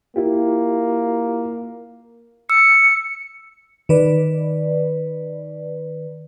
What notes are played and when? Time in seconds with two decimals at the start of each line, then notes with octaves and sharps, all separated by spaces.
0.16 A#3 E4 F4 G4
2.50 E6 C#7
3.89 D#3 B4 D5